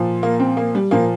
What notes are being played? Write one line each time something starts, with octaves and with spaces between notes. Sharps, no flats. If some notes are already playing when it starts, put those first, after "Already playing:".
Already playing: A#2 F3
A#3
C4
A#3
G3
A#2 F3 A#3